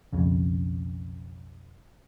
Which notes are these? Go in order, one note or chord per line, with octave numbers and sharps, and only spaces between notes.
B1 F2 C#3